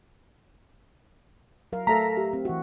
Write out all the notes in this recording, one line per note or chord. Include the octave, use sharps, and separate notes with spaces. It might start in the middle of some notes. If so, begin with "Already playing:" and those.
F#3 A#4 F5
A3 A4 E5 F5 A5 A#5 B6
G4
C4
E3 F#4